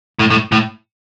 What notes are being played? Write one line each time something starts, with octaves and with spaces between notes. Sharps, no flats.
A2
A2
A2